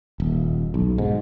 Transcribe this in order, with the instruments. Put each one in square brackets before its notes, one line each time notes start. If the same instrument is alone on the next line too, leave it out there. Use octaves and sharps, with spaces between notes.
[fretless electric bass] D#1
B1
G#2